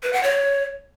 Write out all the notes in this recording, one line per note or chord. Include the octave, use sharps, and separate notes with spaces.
B4
F#5
C#5